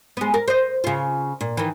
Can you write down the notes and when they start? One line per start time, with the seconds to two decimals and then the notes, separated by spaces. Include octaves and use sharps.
0.17 G#3 B3
0.34 A#4
0.48 C5 D#5
0.84 C#3 F4
1.41 A#2
1.57 D#3 E3